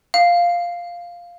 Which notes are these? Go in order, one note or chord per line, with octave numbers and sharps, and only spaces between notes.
F5